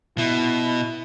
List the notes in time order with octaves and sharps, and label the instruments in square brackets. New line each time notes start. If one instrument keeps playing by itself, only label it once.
[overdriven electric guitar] B2 [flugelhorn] E4